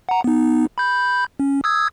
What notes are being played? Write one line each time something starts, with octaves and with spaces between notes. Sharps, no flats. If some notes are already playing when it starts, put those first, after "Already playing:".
F#5 A#5
B3 D#4
B5 G6
C#4
D#6 E6 G#6